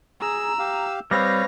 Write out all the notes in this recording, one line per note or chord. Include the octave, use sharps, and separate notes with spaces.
G#4 A#5 E6
G4 F5
G3 C4 B4 C#5 F5 A#6